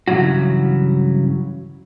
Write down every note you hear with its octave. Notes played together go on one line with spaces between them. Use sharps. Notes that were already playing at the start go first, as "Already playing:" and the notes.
G2 C#3 E3 F#3 F#4